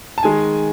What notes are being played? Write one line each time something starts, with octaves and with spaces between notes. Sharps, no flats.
A5
D#3 G#3 G#5